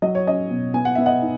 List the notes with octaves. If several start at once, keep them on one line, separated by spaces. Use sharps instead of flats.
F#3 D#5
C#5
C#4 D#5
B2
B3 G#5
F#5
B3 E5
D#5 F#5
D#4